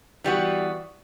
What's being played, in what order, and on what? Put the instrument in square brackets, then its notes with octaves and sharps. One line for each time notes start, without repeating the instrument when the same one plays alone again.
[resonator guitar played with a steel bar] E3 G3 B3 F#4